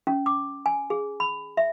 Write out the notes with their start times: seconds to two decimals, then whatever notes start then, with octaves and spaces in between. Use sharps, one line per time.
0.07 C#4
0.26 D6
0.66 G#5
0.90 G#4
1.20 B5
1.57 E5